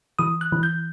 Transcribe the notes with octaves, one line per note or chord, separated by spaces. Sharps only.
E3 D#6
F#6
E3
G6